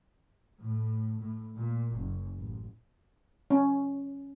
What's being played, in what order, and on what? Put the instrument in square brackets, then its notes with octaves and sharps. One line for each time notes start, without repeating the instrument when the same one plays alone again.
[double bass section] A2
A2
A#2
F#1
A1
[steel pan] C#4